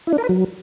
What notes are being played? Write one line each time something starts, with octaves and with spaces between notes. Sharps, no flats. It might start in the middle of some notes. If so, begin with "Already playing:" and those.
E4
D4
A#4
B4
F#3